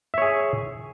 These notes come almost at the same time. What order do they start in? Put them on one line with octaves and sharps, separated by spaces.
E5 C#5 G#4